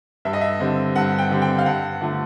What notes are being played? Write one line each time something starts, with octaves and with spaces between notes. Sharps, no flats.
G2 E5
D#5
E5
D3 G3 C4
G2 F#5
G5
D3 G3 C4
G5
F5
G2 F#5
D3 F3 A3